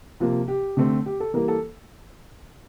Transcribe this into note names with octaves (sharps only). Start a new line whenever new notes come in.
C3 F3 A#3
G4
D3 A3 C4
G4
A4
E3 G3 A#3 A#4
A4